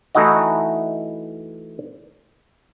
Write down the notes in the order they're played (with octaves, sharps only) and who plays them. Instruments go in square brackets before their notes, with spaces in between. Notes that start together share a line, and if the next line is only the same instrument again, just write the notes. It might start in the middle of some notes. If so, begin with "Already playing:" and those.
[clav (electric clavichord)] E3 A3 D#4 E4 F#4 D#5